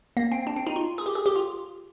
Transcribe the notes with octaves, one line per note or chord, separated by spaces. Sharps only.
A#3
C4
D4
C4
D#4
F4
G#4
G4
G#4
G4
F4